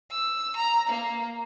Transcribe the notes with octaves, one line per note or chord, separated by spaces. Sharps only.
E6
A#5
A#3